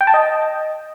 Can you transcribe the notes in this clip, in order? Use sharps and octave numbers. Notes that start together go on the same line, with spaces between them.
G5
A5
D#5